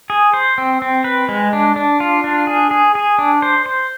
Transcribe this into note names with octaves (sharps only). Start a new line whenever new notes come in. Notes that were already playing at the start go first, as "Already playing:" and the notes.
G#4
C5
C4
C4
B4
G#3
D4
D4
F4
D4
G#4
G#4
G#4
D4
C5
C5